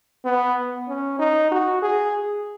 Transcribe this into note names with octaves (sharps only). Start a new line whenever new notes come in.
B3
C#4
D#4
F#4
G#4